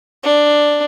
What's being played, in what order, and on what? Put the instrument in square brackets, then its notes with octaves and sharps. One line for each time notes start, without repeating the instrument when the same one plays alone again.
[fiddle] D4